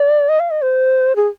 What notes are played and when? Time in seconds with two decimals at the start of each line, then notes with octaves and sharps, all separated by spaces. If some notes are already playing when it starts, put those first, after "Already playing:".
Already playing: D5
0.29 D#5
0.40 F5
0.51 D#5
0.62 C5
1.16 G#4